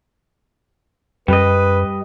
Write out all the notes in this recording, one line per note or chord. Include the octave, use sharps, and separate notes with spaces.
F#2 G3 B4 D#5